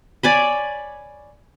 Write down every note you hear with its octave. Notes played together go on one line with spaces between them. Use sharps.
C#5 D5 G#5 B5